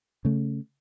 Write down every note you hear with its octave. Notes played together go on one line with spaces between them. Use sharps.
C#3 A3